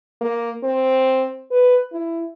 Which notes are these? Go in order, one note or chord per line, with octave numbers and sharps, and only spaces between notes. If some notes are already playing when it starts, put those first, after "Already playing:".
A#3
C4
B4
E4